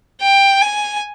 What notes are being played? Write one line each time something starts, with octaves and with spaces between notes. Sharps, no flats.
G5
G#5